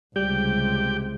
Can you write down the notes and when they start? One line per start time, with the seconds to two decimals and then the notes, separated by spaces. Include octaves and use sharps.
0.16 C#2 C3 G3 G4 G5